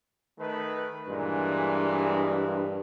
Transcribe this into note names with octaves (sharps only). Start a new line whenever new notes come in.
D#3 A3 B4
G2 A#2 E3 G#3